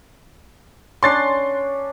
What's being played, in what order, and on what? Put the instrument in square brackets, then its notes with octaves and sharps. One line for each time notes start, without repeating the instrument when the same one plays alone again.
[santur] C#4 D4 [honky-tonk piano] C6 A6 C7